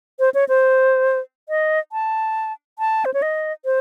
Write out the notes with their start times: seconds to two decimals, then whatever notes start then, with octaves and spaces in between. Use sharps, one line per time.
0.19 C5
0.34 C#5
0.49 C5
1.49 D#5
1.92 A5
2.79 A5
3.05 C5
3.14 C#5
3.22 D#5
3.65 C5